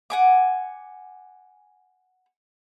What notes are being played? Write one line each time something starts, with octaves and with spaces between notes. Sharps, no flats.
F#5 G#5 D6